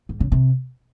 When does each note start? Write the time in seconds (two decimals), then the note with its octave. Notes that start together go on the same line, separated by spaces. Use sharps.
0.09 G#2
0.20 C#3
0.32 C3